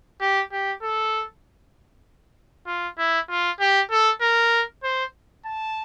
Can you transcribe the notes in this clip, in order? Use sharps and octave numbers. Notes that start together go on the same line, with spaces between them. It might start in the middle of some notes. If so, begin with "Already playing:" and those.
G4
G4
A4
F4
E4
F4
G4
A4
A#4
C5
A5